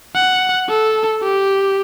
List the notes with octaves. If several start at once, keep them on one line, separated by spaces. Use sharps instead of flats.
F#5
A4
G4